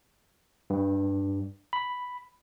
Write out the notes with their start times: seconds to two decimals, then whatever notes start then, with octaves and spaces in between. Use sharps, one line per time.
0.70 G2
1.73 B5